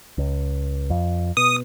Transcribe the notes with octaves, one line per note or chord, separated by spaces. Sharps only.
C#2
F2
B2 D#6